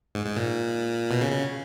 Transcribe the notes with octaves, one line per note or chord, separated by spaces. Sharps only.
G#2
G#2
A#2
B2
C#3
C#3